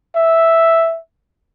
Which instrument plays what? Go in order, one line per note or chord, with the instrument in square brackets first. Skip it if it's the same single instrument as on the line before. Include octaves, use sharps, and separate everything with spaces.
[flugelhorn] E5